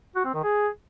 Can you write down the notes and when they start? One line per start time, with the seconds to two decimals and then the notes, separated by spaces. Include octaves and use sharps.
0.16 F#4
0.25 C4
0.34 D#3
0.43 G#4